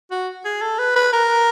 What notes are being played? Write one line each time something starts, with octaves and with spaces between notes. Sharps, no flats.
F#4
G#4
A4
B4
B4
A#4